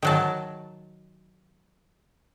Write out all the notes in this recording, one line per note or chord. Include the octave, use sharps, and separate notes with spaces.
D#3 F#3 A5